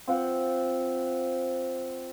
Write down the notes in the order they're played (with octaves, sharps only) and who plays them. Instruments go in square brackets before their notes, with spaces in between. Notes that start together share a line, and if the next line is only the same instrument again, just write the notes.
[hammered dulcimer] C4 F4 F#5